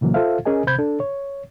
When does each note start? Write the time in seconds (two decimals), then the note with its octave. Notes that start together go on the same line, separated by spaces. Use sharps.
0.01 A#2 C#3 E3 F#3 A#3
0.14 F4 A4 C5 E5 F5
0.45 C#4 G#4 A#4 D#5 G#5
0.67 C3 C5 B5 G6 G#6
0.79 D4 A4
1.00 C#5